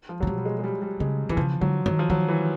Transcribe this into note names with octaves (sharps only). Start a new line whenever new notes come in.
F3
C3 F#3
B2 G3
G3
G#3
G#3
G3
G3
C#3 G#3
D3 E3
C#3 F3
D3 F#3
D#3 F#3
F3
D#3 F#3
E3